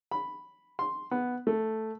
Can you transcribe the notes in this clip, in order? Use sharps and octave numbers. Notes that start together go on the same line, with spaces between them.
B5
C6
B3
A3